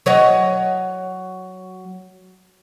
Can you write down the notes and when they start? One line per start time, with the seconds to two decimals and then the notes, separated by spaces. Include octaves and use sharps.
0.06 F#3 C#5 D#5